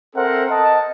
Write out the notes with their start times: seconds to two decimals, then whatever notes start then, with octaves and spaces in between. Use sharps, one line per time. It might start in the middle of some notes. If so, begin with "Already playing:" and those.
0.15 C4 A4 A#4 C5 E5 F#5
0.51 D#5 A5